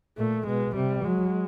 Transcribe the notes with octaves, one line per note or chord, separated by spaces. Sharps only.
A#2 A3
B2 G#3
C3 G3
F#3 G#3